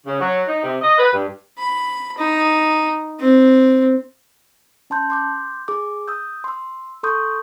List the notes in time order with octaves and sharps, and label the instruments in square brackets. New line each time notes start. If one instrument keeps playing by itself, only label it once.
[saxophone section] C#3
F#3
D#4
C3
D#5
B4
G2
[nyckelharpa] B5
D#4
C4
[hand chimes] C#4 A5 C6 G6
C6 D6 G6
G#4 D6
D#6 E6 G6
C6 E6
A4 C6 C#6 D#6 G6